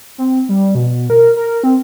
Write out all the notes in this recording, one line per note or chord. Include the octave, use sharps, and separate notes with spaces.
C4
G3
B2
A#4
A#4
C4